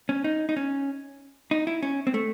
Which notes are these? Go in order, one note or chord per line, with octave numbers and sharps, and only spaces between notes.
C#4
D#4
D#4
C#4
D#4
E4
C#4
C4
A3